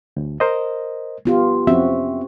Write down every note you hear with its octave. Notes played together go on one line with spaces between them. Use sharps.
D2
A#4 C5 D#5
B3 F4 G4
F2 C4 C#4 F#4 E5